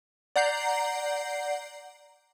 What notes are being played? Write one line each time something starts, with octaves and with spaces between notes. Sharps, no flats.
D5 F#5 A#5 G6 C7